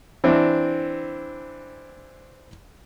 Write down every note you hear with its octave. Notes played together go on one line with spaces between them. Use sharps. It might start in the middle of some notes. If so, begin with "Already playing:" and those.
E3 C4 D4